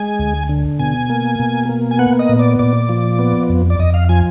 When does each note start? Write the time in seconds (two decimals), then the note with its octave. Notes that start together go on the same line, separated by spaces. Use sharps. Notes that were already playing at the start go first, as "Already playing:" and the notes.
Already playing: G#3 G#5
0.19 D2
0.49 D3
0.79 B2 G#5
1.10 A#3
1.39 B2
1.69 A#3
1.91 G#5
1.99 B3 F#5
2.19 D#5
2.29 A#2
2.39 D5
2.59 A#2 D5
2.89 F3
3.19 B3
3.49 F2
3.70 D5
3.79 F2 D#5
3.94 F5
4.09 F3 G#5